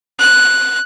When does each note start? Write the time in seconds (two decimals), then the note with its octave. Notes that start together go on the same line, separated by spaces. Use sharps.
0.19 F#6